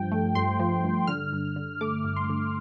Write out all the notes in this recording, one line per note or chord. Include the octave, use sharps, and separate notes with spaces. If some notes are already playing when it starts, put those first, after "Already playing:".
Already playing: G2 F3 G5
A3
G2 C6
F3
G2
D3 F6
G2
D3
A3 D6
G2
C6
D3